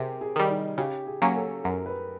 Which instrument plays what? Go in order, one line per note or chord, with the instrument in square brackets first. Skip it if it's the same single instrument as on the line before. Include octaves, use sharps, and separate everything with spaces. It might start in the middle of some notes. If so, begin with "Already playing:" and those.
Already playing: [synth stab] C3 [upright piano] G4 G#4 A#4
[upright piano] G#4
[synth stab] D#3 G3
[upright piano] D#4
[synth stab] C#3 [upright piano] G4
[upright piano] G#4
[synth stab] F#3 A#3 C#4
[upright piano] A4
[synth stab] F#2 [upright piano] A#4
[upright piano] B4